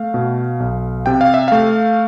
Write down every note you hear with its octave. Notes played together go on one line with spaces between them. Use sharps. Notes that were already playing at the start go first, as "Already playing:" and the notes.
Already playing: A3 F5
B2
B1
C3 G5
F5
E5
A3 F5